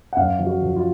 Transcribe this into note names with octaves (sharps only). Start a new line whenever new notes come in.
F#5
F#2 F5
F3
F#4
F3
F4